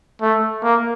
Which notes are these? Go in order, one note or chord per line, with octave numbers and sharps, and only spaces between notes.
A3
A#3